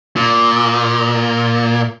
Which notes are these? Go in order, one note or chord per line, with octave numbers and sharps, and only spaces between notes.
A#2